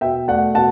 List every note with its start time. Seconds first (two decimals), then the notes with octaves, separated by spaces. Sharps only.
0.01 B2 E5 G5
0.28 A3 D5 F#5
0.55 B2 F#5 A5